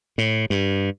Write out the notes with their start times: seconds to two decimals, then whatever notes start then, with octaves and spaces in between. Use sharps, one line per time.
0.18 A2
0.50 G2